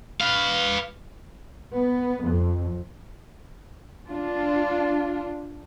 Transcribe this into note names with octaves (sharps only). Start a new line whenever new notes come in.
B4 F5
B3
F2
D4 F4